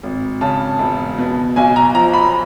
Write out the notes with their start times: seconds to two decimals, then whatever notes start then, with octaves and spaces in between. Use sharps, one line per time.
0.03 G#1
0.41 C#3 A5
0.79 E1
1.18 B2
1.56 B1 G#5
1.76 A#5
1.94 F3 A#5
2.13 B5